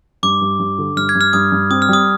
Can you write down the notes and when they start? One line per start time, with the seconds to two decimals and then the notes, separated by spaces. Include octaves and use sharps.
0.23 G2 D6
0.41 G2
0.59 G2
0.78 D3
0.96 G2 F6
1.09 G#6
1.15 G2
1.21 F6
1.33 G2 D#6
1.52 G2
1.70 C4 D#6
1.82 F6
1.89 G3 D#6